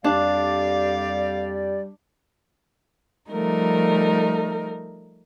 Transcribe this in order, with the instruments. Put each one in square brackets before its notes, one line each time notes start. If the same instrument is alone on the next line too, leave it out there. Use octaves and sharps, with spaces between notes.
[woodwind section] F2 G4 D5 [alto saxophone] G3 [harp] D4 [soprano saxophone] F5
[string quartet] F3 G3 A3 D#4 A#4